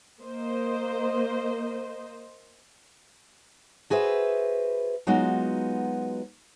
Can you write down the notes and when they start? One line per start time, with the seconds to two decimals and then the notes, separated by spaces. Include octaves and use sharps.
0.20 A#3 C5 D#5
3.90 F#4 G#4 B4 C5 E5
5.07 F#3 G#3 B3 D#4 F4 F#4